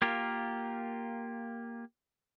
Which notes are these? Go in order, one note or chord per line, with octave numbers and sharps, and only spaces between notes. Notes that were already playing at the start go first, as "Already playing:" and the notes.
A#3 F4 G4 A#4